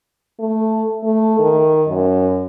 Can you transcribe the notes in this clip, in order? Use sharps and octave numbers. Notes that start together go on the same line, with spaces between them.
A3
A3
D#3
F#2